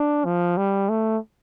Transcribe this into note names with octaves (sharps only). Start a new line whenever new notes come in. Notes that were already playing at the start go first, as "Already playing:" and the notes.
Already playing: D4
F3
G3
A3